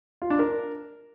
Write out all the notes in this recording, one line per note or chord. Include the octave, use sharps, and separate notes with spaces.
F4
D4
A#4